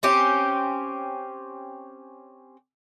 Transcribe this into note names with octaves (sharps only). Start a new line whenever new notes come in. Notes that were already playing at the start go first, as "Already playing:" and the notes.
C4 C#4 G4